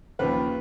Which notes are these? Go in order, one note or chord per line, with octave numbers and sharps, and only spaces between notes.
D#2 C#3 F3 B4